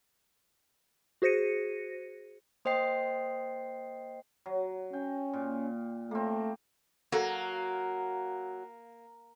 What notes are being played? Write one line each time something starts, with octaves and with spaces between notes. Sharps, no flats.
F#4 G#4 C5 A#6 C#7 D#7
A#3 C5 D#5 G5 C7
F#3
C#4 G5
A#2
A3 A#3 C4
F#3 A#3 F#4 A4 F#5